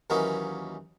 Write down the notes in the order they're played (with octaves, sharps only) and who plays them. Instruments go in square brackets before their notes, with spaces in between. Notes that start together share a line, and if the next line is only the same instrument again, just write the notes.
[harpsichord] D#2 E3 F#3 A#3 C#4 D#4